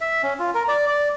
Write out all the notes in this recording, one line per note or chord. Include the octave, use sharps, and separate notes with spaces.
E5
C#4
F4
A#4
D5
D5